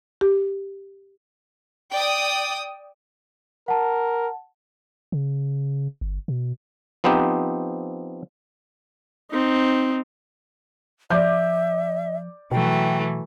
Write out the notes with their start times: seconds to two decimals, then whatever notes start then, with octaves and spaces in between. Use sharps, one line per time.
0.21 G4
1.91 D5 G5 D#6
3.68 A#4 F#5 A5
5.12 C#3
6.01 G1
6.28 B2
7.04 F3 B3 C4 D#4 G4
9.31 C4 D#4
11.10 F3 D5 E5 D6 G6
12.51 B2 E3 F#3 A3 G5